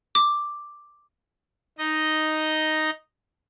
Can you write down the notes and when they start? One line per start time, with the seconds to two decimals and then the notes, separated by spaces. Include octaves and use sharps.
0.15 D6
1.78 D#4 D#5